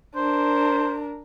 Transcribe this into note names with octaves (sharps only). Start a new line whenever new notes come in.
D4 A#4 C5